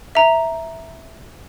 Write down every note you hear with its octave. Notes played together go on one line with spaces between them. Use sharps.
E5 A#5